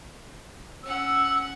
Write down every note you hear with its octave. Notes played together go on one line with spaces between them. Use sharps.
C#4 F#5 E6